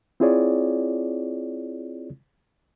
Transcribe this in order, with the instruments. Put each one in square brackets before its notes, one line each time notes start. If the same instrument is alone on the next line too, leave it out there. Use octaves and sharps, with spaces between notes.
[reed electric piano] C4 E4 F4 G#4 C#5 D5